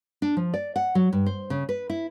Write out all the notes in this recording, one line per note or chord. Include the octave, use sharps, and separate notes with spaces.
D4
F3
D5
F#5
F#3
G2
C5
C#3
B4
E4